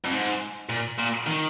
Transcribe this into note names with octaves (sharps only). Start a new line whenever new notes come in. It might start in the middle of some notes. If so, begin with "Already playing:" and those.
F2
G#2
A#2
A#2
D#3